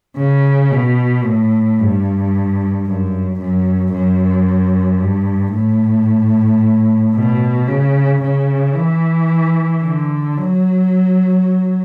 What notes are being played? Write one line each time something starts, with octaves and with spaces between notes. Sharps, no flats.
C#3
B2
A2
G2
F#2
F#2
F#2
G2
A2
B2
C#3
C#3
E3
D3
F#3